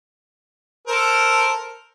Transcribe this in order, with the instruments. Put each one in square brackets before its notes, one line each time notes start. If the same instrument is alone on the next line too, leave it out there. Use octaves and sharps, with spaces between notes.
[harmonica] A4 A#4 C5